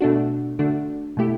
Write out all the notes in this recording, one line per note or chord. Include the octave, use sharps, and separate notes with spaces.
B2 A3 D4 F#4
D3 A3 D4 F#4
B2 A3 E4 G4